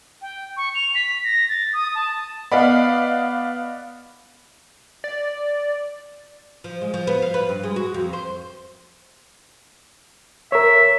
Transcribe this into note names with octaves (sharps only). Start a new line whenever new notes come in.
G5
C#6
F7
B6
A#6
A6
D#6
A5
B3 D5 D#5 F5 F#5 B5
D5
F3
G#3
F3
B3
F5
B4
G2
G#3
F#4
F2
C5
A#4 C#5 E5